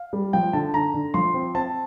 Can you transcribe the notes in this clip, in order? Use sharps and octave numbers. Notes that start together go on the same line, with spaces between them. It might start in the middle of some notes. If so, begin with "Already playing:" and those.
Already playing: F5
G3
F3 G5
D3 A5
D3 A#5
D3
F3 C6
C4
C4 A5